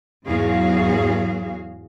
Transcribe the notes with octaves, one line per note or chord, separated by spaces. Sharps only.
E2 G#2 F#3 F#4 G#4 F5